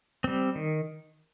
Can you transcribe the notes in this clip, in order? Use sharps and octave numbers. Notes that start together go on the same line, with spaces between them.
G3 C4
D#3